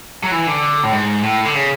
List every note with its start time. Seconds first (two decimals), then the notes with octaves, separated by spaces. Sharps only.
0.23 F#3
0.31 E3
0.47 D3
0.83 A2
0.92 G#2
1.23 A2
1.45 D3
1.54 C#3